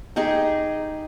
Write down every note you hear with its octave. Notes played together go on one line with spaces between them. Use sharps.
D#4 G4 G#4 D#5